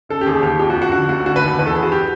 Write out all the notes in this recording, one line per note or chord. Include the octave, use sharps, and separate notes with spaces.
C#3 A4
G4
D#2 G#4
D#2 G4
F2 G4
F#4
F2
F#4
D3 F#4
D2 F#4
D3 F#4
B4
D#2
B4
E2 B4
A4
E2 G#4
F#4
G4